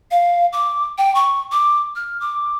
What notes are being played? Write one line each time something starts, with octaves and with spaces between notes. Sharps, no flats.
F5
D6
G5
C#6
D6
F6
D6